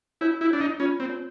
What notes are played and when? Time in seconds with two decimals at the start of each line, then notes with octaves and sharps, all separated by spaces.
0.21 E4 C#5
0.41 E4
0.51 D4 C#5
0.60 D#4
0.80 C#4 F4
1.00 C4
1.10 C#5